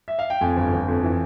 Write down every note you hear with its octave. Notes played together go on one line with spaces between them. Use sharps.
E5
F5
G5
F2 G#5
G1
G1
F2
E3